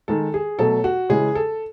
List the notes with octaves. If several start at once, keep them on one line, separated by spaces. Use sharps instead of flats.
D#3 G#3 A4
G#4
B2 F#3 A3 A4
F#4
C#3 E3 G#3 G#4
A4